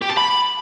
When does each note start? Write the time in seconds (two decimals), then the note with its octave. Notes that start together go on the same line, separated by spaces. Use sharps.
0.01 G4
0.09 A5
0.17 B5